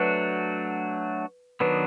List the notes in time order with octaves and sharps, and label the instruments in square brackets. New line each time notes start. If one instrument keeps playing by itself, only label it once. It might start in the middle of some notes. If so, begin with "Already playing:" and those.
Already playing: [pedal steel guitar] F#3 A3 D4 F#4 [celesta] B4
[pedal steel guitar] D#3 F#3 B3 D4 [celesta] B4